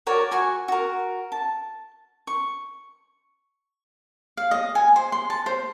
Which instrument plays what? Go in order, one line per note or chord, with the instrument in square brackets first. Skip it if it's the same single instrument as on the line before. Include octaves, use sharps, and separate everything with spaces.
[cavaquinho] F#4 A#4 C#5 D5
F#4 G#5 C#6
F#4 A#4
A5
C#6
F5
D#5
G#5
C5
C6
A5
C5